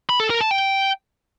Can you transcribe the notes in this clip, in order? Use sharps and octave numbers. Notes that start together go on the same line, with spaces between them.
B5
A4
A#4
A5
G5